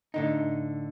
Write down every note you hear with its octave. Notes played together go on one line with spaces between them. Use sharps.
A2 D3 D#4